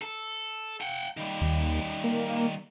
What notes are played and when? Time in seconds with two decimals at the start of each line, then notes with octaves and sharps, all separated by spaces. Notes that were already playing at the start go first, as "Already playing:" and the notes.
0.02 A4
0.81 F#5 G5
1.17 D#3 G3
1.41 D#2
2.04 A#3